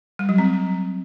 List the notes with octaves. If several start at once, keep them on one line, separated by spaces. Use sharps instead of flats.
G3
F#3
C4